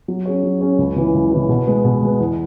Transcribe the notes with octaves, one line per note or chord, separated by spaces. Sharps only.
F#3
C#4 G#4 C#5
F#3
C#4 G#4 C#5
C#2
C#3 E3
C#2
C#3 E3
B2
G#3 B3
B2
G#3 B3
E2